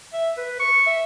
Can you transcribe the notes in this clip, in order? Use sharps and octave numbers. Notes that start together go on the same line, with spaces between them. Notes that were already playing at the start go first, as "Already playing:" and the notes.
E5
B4
C#6
E5